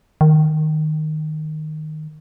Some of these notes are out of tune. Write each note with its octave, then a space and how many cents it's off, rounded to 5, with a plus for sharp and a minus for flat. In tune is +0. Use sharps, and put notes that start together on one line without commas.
D#3 -10